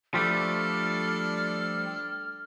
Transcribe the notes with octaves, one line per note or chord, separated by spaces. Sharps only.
F3 G3 A3 D4 A4 F6